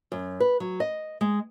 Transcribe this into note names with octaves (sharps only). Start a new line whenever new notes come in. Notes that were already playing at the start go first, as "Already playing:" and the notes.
F#2
B4
F#3
D#5
G#3